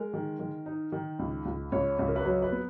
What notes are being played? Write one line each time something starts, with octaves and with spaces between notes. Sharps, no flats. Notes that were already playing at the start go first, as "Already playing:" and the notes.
Already playing: G#3 A#4
D#3
D#3
D#4
D#3
C#2
C#2
C#2 C#5
C#2
A#4
B4
F#3 C#5
B4
B3